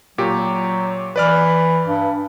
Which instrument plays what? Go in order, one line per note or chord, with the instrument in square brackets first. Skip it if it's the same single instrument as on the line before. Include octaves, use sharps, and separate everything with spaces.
[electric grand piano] A#2 G4 [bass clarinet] F#3
[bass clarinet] E3 [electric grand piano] B4 D5 F6
[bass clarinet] G2